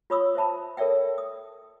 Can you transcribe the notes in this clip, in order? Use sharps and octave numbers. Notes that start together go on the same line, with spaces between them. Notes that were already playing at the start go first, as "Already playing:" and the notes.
F4 C#5 B5 C#6 D#6 E6
C5 E5 A5 B5
A4 A#4 C#5 D5 E5 G5
D#6